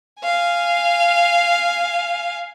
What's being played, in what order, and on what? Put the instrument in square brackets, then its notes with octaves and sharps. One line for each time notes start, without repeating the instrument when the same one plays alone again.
[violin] F5 G#5